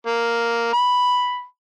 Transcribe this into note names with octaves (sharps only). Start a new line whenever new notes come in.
A#3
B5